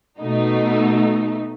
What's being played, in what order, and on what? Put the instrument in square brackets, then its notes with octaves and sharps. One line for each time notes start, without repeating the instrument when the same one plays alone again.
[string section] B2 A3 D#4